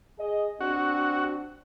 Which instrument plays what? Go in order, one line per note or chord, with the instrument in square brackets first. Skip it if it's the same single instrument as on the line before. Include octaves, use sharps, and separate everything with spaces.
[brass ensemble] G#4 D#5
[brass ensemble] C4 D4 [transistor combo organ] F#4